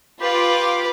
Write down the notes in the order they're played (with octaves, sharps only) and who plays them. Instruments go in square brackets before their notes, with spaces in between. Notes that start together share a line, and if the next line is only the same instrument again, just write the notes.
[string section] F4 D6 [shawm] G4 [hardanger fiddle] B4